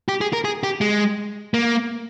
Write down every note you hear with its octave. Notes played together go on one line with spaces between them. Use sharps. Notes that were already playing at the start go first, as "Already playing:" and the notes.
G4
G#4
A#4
G#4
G4
G#3
A#3